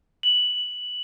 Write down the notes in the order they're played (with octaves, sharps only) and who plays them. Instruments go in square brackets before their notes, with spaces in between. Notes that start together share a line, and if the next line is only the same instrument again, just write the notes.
[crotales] F#7